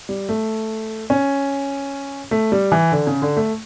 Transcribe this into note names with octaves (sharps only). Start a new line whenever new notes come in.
G3
A3
C#4
A3
G3
E3
D3
C#3
D3
A3